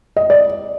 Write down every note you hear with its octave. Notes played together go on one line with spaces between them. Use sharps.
D#5
D5